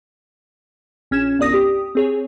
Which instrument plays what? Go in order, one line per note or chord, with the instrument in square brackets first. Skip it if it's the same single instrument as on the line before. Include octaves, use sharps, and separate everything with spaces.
[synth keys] A#1 C#4 G#6 E7
G1 C2 D5 D#6 A#6
G4 D#6
C4 G#4 C#5